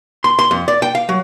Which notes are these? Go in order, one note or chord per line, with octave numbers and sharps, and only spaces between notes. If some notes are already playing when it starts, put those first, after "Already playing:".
C6
C6
F2
D5
G5
F5
F#3